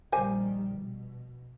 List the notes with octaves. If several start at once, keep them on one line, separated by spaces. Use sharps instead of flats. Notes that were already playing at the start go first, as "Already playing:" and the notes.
A#1 D#3 G3 G4 C5 G#5
B2